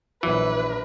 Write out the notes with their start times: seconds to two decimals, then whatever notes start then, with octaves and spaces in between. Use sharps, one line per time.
0.23 A#1 E3 F#3 B4